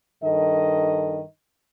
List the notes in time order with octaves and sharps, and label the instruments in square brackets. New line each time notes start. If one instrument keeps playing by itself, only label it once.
[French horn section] G2 D#3 A4 D#5